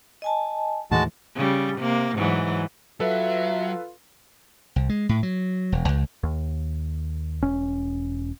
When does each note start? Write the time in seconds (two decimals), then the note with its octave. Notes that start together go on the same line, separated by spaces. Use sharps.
0.22 D#5 G#5 A5
0.91 D#2 A2 E3 G#3 F#4 A5
1.36 C#3 G3
1.79 C3 A#3
2.16 G#2 E3 F#3
3.00 F#3 F4 A4 B4 E5
4.76 C2
4.89 G#3
5.09 A2
5.23 F#3
5.72 E1
5.89 C#2
6.23 D#2
7.42 E1 C#4